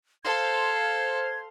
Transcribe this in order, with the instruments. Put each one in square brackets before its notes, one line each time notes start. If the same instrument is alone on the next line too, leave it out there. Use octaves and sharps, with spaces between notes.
[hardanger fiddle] A4 [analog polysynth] C5 F5 C6 [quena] G#6